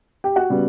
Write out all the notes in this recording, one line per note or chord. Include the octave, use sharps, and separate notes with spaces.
G4 G5
F#4 F#5
C#3 G3 B3